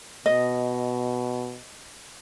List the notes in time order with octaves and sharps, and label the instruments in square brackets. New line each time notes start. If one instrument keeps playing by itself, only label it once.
[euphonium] B2 [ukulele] D#5